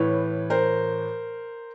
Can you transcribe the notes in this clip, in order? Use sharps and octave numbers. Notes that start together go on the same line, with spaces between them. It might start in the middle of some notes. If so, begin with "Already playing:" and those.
Already playing: A2 E3 B4 C#5
A#4 C5